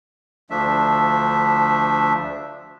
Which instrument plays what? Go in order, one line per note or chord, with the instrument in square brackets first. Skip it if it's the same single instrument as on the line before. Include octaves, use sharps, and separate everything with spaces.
[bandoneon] D2 F3 A3 D4 E5